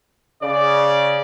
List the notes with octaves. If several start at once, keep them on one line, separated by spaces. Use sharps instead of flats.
C#3 D5